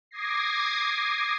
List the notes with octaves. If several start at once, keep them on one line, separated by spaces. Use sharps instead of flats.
D6 D#6 G#6 A#6 C7